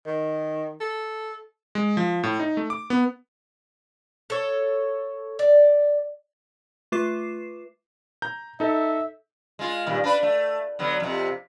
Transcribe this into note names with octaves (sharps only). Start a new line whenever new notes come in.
D#3
A4
G#3
F3
A2
D#4
A3
D6
B3
A4 C#5
D5
A3 F4 B4 D6 C7 E7
A#5 G6
D#4 A4 E5
G#3 F4
G2 A#2 D#3
D4 B4
A3
D3 F#3 B3
F2 C3